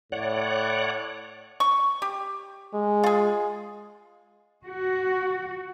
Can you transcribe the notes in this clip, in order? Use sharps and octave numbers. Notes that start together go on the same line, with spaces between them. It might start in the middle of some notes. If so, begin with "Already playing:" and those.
A2 C#5 D5 F#5
C#6
G4
G#3
F4 G#4
F#4